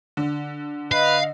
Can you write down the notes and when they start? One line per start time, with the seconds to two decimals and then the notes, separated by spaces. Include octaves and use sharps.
0.17 D3
0.92 B4 D#5 F5